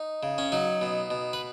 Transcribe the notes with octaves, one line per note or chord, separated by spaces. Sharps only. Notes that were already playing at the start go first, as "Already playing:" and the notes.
Already playing: D#4
C#3
C#4
F#3 D#4
B2
B2
B4